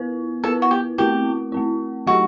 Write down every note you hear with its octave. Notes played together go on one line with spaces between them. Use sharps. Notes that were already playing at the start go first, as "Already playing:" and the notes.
Already playing: B3 E4 B4
B3 E4 A4 B4
F#4
G4
A3 C4 E4 G4
A3 C4 E4
F#3 A3 D#4 F#4 G4